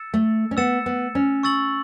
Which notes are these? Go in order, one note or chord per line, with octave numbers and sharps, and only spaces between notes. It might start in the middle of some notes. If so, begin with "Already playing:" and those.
Already playing: E6 A6 C#7 E7
A3
C#4
B3 E6 A6 C#7 E7
B3
C#4
C#6 E6 A6 F#7